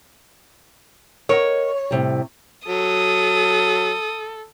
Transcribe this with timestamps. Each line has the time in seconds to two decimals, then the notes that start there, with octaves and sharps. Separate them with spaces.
1.29 A#4 C#5 D#5 F#5
1.91 A2 C3 G3
2.68 F#3 A4 D#6